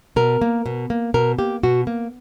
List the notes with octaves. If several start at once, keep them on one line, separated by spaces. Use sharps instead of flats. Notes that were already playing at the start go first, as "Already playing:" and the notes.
B2 A#4
A#3
B2
A#3
B2 A#4
A#3 G4
B2 F#4
A#3